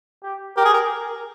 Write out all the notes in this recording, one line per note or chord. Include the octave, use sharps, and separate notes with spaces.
G4
G4 A#4
G#4
A#4